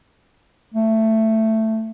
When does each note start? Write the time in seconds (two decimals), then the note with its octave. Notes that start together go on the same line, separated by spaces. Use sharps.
0.74 A3